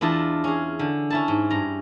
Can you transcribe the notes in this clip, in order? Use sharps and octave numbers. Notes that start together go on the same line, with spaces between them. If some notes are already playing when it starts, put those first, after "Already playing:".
E2 D4 E4 F4 D#5 A5
C#4 G#4
D3
C#4 E4 A5
G#2
G2 A#5